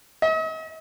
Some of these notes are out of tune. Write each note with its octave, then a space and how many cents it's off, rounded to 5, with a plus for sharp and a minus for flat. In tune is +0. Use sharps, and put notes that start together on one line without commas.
D#5 +45